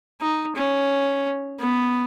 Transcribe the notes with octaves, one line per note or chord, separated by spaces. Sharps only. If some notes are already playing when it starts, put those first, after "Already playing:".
D#4
C#4
B3